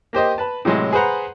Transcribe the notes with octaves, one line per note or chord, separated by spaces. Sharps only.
A#3 G4 C5 D#5
B4 A5
A2 C3 E3 F#3 G#3
G#4 B4 C5 F#5 A#5